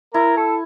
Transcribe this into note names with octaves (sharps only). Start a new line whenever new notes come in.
E4 A#4
A4